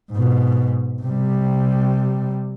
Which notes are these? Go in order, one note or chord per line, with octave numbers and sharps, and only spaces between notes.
G#2 B2
C3 G3